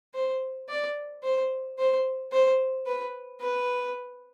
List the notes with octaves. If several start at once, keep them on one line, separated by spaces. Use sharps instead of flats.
C5
D5
C5
C5
C5
B4
B4